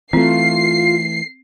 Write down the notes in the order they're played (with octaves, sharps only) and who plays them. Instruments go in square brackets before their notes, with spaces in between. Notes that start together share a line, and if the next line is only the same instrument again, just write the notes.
[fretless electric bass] E3 A3 [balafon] C4 [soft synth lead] F4 [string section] C7